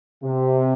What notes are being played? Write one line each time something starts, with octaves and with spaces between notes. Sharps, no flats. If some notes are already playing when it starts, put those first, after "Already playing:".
C3